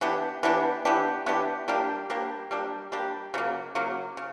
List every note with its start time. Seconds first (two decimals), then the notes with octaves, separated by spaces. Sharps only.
0.01 E3 B3 D4 G4
0.43 E3 B3 D4 G4
0.85 E3 B3 D4 G4
1.26 E3 B3 D4 G4
1.68 G3 A#3 D4 G4
2.10 G3 A#3 D4 G4
2.51 G3 A#3 D4 G4
2.92 G3 A#3 D4 G4
3.34 C#3 F#3 A#3
3.75 C#3 F#3 A#3
4.17 C#3